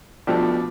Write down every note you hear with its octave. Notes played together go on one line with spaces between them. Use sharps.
B2 F3 A3 D4 G4